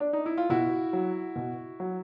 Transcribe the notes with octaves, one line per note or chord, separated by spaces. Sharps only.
D4
D#4
E4
F4
B2 E4 F#4
F#3
B2
F#3